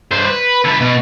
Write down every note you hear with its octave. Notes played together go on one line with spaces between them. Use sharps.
G2 C5
B4
D3 B4
B2